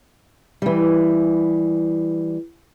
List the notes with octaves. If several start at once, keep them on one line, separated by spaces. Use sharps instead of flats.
E3 G3